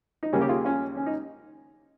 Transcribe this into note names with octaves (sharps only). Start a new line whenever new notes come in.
D#4
D#2 C#3 G3 A#3 C#4
G4
F4 G#4
C#4 F4
C#4
D#4